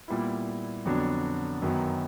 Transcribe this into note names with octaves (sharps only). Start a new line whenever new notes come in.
A#2 G3 B3 E4
F2 D3 F#3 B3 D4
F#2 D#3 F#3 B3